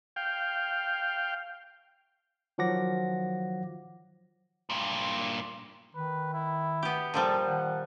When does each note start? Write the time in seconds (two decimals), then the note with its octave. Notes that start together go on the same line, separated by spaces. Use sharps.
0.16 F5 G5
2.58 D#3 F3 F#3 F#5 D6 A#6
4.70 G2 A#2
5.95 D#3 B4
6.33 E4
6.83 B3 G4
7.14 A#2 F3 G3 A4
7.46 D#3 F#5